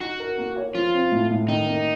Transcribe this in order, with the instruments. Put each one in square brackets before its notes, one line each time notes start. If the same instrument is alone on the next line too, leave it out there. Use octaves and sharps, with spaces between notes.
[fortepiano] D#4 [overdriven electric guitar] F#4
[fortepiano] A#4
A#3
C#5
[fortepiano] F3 [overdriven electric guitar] F4
[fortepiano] C4
A2
A2
[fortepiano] D#3 [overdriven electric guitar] D#4
[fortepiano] A#3